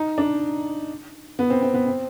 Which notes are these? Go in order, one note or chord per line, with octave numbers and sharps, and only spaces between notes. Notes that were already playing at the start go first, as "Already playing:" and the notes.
Already playing: D#4
D4
B3
C4
C4
B3
C4